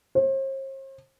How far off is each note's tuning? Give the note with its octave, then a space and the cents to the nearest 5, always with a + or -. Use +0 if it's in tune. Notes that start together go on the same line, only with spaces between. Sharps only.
C5 +45